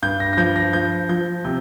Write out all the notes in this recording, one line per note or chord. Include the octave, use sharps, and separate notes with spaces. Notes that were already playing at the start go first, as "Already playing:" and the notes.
G2 G6
A#6
A#6
F3 G6
A#6
F3 G6
F3 G6
C3 G6